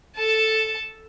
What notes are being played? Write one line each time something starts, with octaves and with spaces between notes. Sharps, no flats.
A4 A5